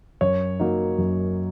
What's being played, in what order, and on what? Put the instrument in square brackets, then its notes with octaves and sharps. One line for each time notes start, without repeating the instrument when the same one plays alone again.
[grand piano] F#2 C#5
F#3 A#3 D#4
F#2